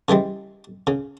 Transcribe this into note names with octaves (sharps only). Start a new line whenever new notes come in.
C#3 E3 G3 G#3
C#3